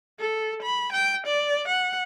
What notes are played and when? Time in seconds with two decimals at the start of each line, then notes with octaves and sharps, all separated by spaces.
0.20 A4
0.63 B5
0.93 G5
1.27 D5
1.68 F#5